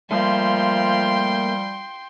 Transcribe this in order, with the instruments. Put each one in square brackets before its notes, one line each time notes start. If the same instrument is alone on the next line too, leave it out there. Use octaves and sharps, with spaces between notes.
[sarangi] F3 [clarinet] G3 [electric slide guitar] A3 A#3 [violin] G5 C6